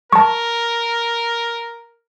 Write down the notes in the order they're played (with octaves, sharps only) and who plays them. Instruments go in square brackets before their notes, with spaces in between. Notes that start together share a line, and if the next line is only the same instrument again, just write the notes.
[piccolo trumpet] A#4 [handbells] A5 C#6